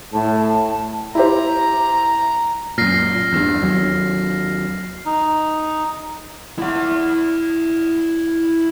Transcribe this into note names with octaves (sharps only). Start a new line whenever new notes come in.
A2 A5
A5
E4 G4 C5 A#5
F#2 A#2 F6 A#6 C7
E2 G2
D#2 F#3
D#4
E4 F#5